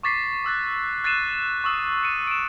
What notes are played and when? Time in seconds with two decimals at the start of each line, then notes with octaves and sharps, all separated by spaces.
0.03 C#6 D6 A6 B6 C7
0.44 D6 E6 F#6 A6
1.04 F#6 A6 C7 D#7 E7
1.64 C#6 D#6 E6
2.03 C#7 D#7
2.27 D7 E7